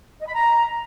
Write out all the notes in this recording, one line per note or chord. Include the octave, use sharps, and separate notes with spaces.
D#5
B5
A#5